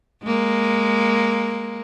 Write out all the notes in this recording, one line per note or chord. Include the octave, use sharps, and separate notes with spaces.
G#3 A#3